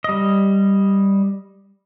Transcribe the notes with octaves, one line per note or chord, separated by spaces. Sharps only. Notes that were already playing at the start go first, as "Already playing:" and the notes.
G3 D#5